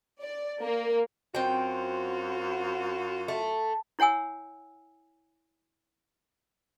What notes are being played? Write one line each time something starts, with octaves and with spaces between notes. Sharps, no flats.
D5
A#3
F#2 C4 F4 F#4 G5
A3
E4 C#5 F#5 G#5 E6